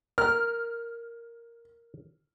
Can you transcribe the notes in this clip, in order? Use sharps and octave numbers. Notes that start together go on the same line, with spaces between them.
A#4 F6